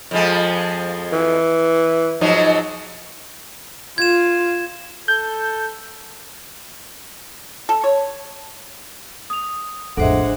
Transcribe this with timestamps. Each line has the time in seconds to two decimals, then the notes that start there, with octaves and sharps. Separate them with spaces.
0.11 F2 F3 G#3
1.13 E3
2.21 G#2 F3 F#3 D#4
3.98 F4 G#6 E7
5.08 A4 G6
7.69 A4
7.84 C#5
9.30 D#6 F7
9.97 A1 F2 G#3 D4 A4 C5 E5 F#5